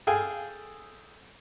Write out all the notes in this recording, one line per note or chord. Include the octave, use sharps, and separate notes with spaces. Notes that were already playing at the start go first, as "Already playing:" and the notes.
G#4 A4 F5 G5 G#5